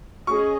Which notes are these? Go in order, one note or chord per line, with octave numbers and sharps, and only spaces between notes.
C#4 G#4 D#5 C#6